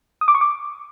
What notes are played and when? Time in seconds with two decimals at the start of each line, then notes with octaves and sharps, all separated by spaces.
0.21 D#6
0.28 D6
0.35 C#6
0.41 D6